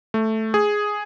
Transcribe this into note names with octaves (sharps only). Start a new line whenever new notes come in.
A3
G#4